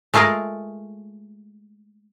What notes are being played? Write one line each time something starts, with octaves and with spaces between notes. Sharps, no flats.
G#3 A3 F4 G#4 A#4